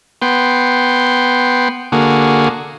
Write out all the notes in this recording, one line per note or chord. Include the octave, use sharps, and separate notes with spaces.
B3 G5 C6
D3 A#3 F#4 G#4